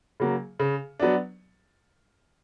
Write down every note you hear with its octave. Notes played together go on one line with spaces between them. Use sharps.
C#3 F#3 A#3
C#3
F#3 B3 D4